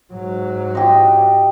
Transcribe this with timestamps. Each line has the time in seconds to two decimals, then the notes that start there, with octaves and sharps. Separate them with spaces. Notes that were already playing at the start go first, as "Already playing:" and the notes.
0.13 G#2 F#3
0.75 G4 D#5